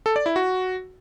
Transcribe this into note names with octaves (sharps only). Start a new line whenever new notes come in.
A4
D5
E4
F#4